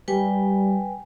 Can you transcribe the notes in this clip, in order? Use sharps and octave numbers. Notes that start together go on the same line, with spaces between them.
G3 B4 G5 G#5